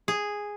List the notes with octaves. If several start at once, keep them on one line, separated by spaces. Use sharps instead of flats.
G#4